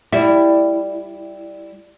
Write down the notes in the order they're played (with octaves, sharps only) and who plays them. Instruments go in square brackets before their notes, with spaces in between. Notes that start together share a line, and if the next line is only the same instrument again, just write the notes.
[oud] G3 E4